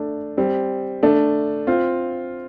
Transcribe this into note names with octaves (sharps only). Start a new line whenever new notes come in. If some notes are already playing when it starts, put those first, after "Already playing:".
Already playing: A3 D4
G3 C4
A3 D4
C4 F4